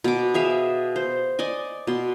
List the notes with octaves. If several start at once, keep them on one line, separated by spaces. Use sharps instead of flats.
B2 D6
G#4 E5 F5 G#5
C5
D5 D#5 G#5
B2 C6